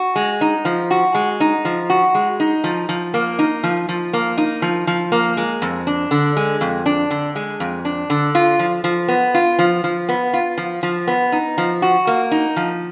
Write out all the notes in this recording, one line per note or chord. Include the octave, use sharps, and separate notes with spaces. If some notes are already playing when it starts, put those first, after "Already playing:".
Already playing: F#4
G#3
D#4
F3
F#4
G#3
D#4
F3
F#4
G#3
D#4
F3
F3
A#3
D#4
F3
F3
A#3
D#4
F3
F3
A#3
G#3
F2
D4
D3
G#3
F2
D4
D3
G#3
F2
D4
D3
F4
F3
F3
B3
F4
F3
F3
B3
F4
F3
F3
B3
D#4
F3
F#4
A#3
D#4
F3